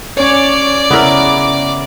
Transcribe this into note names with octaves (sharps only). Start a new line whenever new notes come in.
C#4 C#5 D5 D6
C#3 B3 E4 A#4